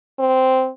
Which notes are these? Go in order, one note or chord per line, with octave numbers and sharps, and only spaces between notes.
C4